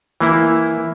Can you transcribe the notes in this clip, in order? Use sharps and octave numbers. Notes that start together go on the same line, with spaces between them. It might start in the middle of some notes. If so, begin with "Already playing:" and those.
E3 A#3 E4